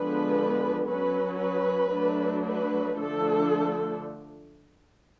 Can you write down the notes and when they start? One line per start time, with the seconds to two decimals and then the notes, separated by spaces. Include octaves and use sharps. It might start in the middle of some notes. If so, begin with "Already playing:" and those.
Already playing: D3 F3 G#3 B3 D4 B4
0.87 F#3 C#4 B4
1.40 B4
1.93 F#3 A3 D4
2.46 B4
2.97 D3 F3 A3 D4 A4